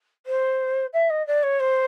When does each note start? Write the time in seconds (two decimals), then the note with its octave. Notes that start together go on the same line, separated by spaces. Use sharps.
0.26 C5
0.93 E5
1.10 D#5
1.27 D5
1.43 C#5
1.60 C5